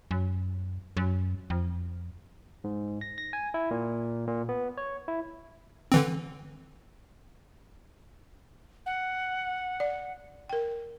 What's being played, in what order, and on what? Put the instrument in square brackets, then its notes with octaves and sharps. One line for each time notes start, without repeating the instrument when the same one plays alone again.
[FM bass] F#2
F#2
F2
[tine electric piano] G#2
A#6
A#6
G#5
E4
A#2
A#2
B3
C#5
E4
[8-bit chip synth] D3 E3 C4
[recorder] F#5
[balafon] D5
A#4 G5